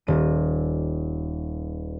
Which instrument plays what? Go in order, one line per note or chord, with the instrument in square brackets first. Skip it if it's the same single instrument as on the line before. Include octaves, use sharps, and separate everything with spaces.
[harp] D#1 D#7